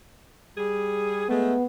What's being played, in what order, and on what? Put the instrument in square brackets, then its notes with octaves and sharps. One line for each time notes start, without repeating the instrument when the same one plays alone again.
[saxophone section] G3 G#4
[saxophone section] G#3 A3 [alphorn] B3